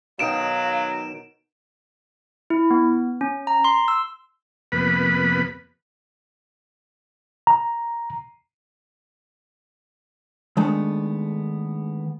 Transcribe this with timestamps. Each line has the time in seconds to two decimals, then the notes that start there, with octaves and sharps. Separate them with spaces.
0.19 B2 D#3 F#3 D#4 F5 D7 E7
2.50 E4
2.71 B3
3.21 C#4
3.47 A#5
3.64 C6
3.88 E6
4.72 F2 C3 A#3 B3 B4 B5
7.47 A#5
10.57 D#3 G#3 A3 B3 D4